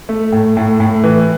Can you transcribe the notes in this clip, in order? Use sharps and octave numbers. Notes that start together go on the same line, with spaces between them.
A3
A2
A2
A2
E3